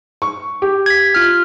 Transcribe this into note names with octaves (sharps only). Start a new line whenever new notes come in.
C#6
G4
G#6 B6
F4 F6